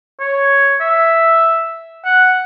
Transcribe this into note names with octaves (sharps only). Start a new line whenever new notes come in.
C#5
E5
F#5